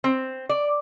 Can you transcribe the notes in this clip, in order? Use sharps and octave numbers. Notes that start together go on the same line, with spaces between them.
C4
D5